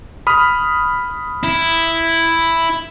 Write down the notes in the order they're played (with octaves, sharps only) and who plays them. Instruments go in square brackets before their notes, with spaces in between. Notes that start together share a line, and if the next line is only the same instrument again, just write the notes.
[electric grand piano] B5 D#6 F6
[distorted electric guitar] E4